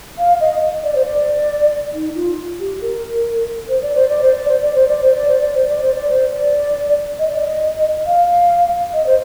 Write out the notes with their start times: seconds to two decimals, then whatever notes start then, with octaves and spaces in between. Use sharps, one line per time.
0.18 F5
0.41 D#5
0.84 D5
0.95 C5
1.05 D5
1.94 D#4
2.15 F4
2.60 G4
2.81 A#4
3.69 C5
3.82 D5
3.95 C5
4.08 D5
4.22 C5
4.35 D5
4.49 C5
4.62 D5
4.75 C5
4.88 D5
5.02 C5
5.15 D5
5.28 C5
5.41 D5
5.55 C5
5.68 D5
5.82 C5
5.95 D5
6.08 C5
6.32 D5
7.19 D#5
7.29 D5
7.40 D#5
8.06 F5
8.94 D#5
9.06 C5